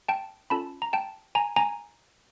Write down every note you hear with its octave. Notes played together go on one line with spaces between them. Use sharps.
G5 A5
C#4 F4 A4 A5 B5
A#5
G5 A5
G#5 A#5
G#5 A#5